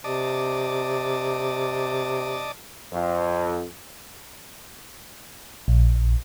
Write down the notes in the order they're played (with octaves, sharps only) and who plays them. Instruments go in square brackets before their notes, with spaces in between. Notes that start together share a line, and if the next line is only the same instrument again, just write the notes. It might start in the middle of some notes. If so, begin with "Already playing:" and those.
[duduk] C3 [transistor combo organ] D5 D#5 A5
[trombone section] F2
[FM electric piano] A#1